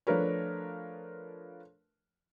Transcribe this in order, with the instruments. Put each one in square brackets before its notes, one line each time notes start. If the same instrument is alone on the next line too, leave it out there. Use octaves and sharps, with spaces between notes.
[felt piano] F3 A3 D4 A#4 B4 C#5